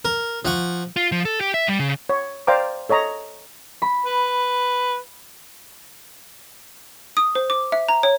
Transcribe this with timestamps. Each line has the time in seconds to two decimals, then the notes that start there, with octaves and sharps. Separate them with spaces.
0.05 A#4
0.45 F3 F#5 C#6
0.96 F4
1.12 F3
1.25 A4
1.41 G4
1.54 E5
1.68 G3
1.80 C#3
2.09 C#5
2.47 C5 D5 F5 G5 A#5 D6
2.89 A4 C#5 D#5 A#5
3.82 B5
4.06 B4
7.17 D#6
7.35 C5
7.50 D6
7.72 E5
7.88 A#5
8.03 C#5